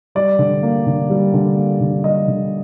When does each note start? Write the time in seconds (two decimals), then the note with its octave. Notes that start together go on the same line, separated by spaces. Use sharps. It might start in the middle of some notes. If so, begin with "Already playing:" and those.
0.15 G3 D5
0.39 D3
0.63 A#3
0.86 D3
1.10 G3
1.34 D3
1.57 A#3
1.81 D3
2.04 G3 D#5
2.28 D3